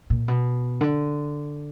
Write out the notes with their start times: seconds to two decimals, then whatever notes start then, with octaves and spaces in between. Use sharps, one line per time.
0.10 A#2
0.28 B2
0.81 D3